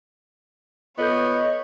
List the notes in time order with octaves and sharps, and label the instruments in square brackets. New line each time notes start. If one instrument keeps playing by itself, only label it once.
[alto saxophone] B3 [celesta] F4 A4 G6 [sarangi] C#5 [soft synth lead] D#5